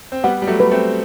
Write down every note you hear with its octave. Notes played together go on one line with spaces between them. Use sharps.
C4
G3 B3 F#5
G3
F#3 A3
B4
A3 C4